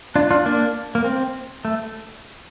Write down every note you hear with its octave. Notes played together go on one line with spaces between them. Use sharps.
D4 F4
D4 F4
A#3 D4
A#3
C4
A3